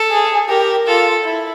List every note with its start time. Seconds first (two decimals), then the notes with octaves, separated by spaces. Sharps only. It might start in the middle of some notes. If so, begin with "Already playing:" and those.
Already playing: A4
0.11 G#4
0.49 G4 A#4
0.87 F4 A4
1.24 E4